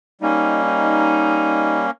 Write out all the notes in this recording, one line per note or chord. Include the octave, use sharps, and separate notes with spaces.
G3 A#3 C#4 D#4
D#4